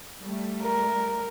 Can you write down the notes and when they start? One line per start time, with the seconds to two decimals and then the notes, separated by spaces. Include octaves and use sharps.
0.21 G3 A3
0.61 A#4